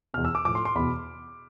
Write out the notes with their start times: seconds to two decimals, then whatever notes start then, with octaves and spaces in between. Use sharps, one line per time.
0.14 E2 B2 F6
0.25 E6
0.35 D6
0.45 A2 F3 D6
0.55 C6
0.65 C6
0.75 E2 B2 B5